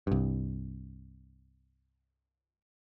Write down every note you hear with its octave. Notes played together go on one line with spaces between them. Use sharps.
C2 G2